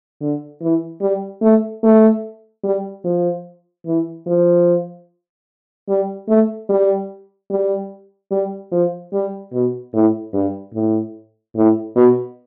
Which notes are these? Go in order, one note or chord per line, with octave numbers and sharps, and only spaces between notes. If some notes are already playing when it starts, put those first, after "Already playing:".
D3
E3
G3
A3
A3
G3
F3
E3
F3
G3
A3
G3
G3
G3
F3
G3
B2
A2
G2
A2
A2
B2